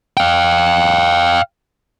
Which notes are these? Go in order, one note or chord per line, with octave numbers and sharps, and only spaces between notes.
F5 G5